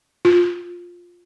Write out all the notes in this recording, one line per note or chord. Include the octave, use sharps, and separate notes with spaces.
F4